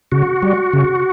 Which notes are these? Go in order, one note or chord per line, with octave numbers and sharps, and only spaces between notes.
C#3 F#4
G3
C#3